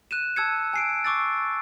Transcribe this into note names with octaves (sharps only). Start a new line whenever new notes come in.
F#6 D#7 E7
A5 E6 G#6 C#7
G#5 C7 D7
C#6 D6 E6 A6